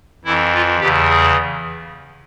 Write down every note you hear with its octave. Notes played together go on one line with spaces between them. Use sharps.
F2 E3 E4
F4
E2 C#3 E3 G4
G#4